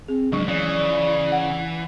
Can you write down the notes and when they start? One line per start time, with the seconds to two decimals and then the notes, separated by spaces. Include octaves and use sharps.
0.08 C4 G#4
0.32 C#2 G#2 F3 F#3 D4 C#6
0.48 C#3 E3 D5
1.32 F#5